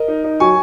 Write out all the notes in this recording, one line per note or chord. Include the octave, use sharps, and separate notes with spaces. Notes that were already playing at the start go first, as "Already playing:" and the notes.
Already playing: A#4 D#5
D#4
D#4
F#3 G#5 C#6